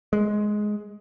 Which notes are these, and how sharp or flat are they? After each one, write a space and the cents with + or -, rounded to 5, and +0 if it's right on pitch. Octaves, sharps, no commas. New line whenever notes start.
G#3 +10